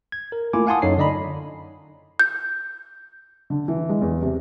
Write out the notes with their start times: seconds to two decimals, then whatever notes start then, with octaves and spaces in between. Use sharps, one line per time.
0.12 G#6
0.32 A#4
0.53 A3 A#3 E4 F4 G#5 D6
0.67 F5 F#5 G#5 A5 C6 D#6
0.82 F#2 D#4 A4 C#5 C7
0.98 D3 D5 D#5 A#5 B5
2.20 G6
3.50 D3
3.68 E3
3.89 G#3
4.01 E2
4.22 C3